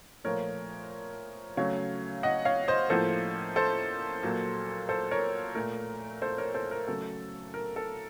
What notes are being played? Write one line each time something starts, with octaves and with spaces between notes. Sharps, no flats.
A#2 F3 A3 A#4 C#5
C#3 F#3 A3 C#5 F5
D#5 F#5
C#5 F5
C5 D#5
A2 F3 A#3 A4 C5
A4 C5
A#2 F#3 A#3
A4 C5
A#4 C#5
A#2 A3 A#4
A4 C5
A#4 C#5
A4 C5
A#4
C#3 F#3 A3 A4
A#4
A4